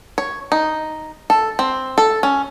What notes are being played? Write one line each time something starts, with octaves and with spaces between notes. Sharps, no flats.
C#5
D#4
A4
C4
A4
C#4